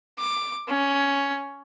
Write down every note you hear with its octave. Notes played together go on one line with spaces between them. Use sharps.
D6
C#4